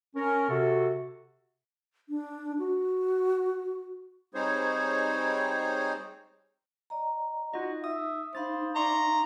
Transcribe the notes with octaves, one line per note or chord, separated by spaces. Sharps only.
C#4 A#4
C3 F#4 A4
D4
F#4
G3 C4 D#4 G#4 C5 C#5
D5 D#5 A#5
D#4 F4 F#4 D#5
E5 D#6
D4 D#4 C5 F5 B5 D#6 A6
D5 E5 A#5 C6 C#6